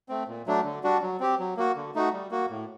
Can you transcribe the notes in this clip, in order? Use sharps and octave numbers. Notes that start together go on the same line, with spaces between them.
A3 C4
A#2
F#3 A3 D4
D3
G3 D4 F#4
F#3
C4 G4
F#3
A#3 F#4
D3
A3 D#4 F#4
G3
A#3 F#4
A2